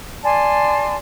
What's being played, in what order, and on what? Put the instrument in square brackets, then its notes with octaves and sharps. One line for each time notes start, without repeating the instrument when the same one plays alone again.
[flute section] D5 G#5 A5 C6